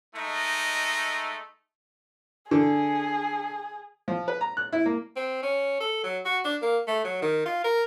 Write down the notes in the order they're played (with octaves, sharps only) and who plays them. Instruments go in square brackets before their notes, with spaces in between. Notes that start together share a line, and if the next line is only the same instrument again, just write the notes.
[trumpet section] G#3 A3 D#4
[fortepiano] D3 [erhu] G#4
[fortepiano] F3
B4
A#5
F#6
E4
A#3
[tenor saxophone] C4
C#4
A4
F#3
F#4
D4
A#3
A3
F#3
D#3
F4
A#4